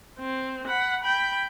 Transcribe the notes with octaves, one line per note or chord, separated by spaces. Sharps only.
C4
F#5 B5
G5 B5